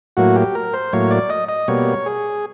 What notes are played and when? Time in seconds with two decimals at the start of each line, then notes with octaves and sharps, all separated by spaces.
0.17 A2 F#3 A#3 F#4
0.36 G4
0.55 A#4
0.74 C5
0.93 A2 F#3 A#3 C#5
1.11 D5
1.30 D#5
1.49 D#5
1.68 B2 G3 A#3 C#5
2.06 G#4